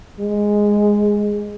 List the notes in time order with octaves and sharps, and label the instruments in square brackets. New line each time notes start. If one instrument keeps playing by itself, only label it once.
[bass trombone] G#3